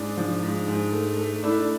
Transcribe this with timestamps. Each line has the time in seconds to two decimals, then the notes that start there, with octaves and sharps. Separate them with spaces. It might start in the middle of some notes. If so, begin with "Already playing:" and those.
Already playing: G#2 D4
0.17 F3
0.43 G#2
0.68 G#2
0.92 A3
1.18 A3
1.43 A3 D4 E4